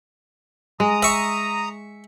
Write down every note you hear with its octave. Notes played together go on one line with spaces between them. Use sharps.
G#3 A#5 D#6
E5 C#6